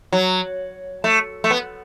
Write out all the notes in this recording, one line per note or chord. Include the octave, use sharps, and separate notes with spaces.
F#3
A3
A3
B3